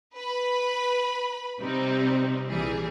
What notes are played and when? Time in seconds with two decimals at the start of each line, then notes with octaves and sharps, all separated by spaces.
0.16 B4 B5
1.60 C3 G3 C4 D#4
2.47 A#1 E3 G3 G#4